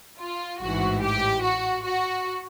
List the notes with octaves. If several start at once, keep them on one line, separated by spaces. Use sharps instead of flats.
F4
A1 G#2 E3 F#4
G4
F#4
F#4